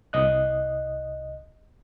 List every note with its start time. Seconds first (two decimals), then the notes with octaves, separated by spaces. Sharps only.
0.13 C2 D#5 F#6